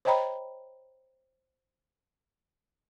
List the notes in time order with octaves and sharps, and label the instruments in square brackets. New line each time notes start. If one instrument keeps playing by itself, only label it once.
[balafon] C5 C#5 D#5 G5 A#5 B5